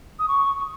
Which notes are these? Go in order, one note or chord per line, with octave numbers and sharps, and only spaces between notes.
D#6
C#6